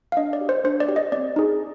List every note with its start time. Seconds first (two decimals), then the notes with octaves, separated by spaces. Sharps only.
0.12 F5
0.17 D4 D#5
0.33 D5
0.41 G4
0.49 C5
0.64 D4 C5
0.80 D5
0.89 G4
0.96 D#5
1.12 C4 D5
1.36 D#4 G#4